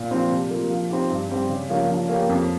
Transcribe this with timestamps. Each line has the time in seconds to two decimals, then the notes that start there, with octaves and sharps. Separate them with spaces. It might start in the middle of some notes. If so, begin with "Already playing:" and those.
Already playing: A#2
0.11 F3 C4
0.30 C3
0.50 F3 A#3 F4
0.70 F3
0.90 C4 D#4 G4
1.10 G2
1.30 G3 C4 G4
1.49 C#3
1.69 F3 A#3 C#4
1.90 F3
2.09 A#3 C#4 G4
2.29 F2